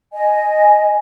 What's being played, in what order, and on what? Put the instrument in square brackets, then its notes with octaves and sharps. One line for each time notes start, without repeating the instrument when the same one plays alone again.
[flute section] D#5 G#5